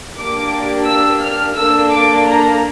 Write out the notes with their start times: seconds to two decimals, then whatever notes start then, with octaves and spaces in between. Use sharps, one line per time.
0.18 A#3 D4 G4 D6
0.87 E6
1.22 F6
1.57 A#3 D4 A4 E6
1.92 D6
2.26 A#5